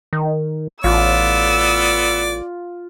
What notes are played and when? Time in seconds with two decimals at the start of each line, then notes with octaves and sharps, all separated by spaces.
0.13 D#3
0.84 A1 B3 F4 D5 E6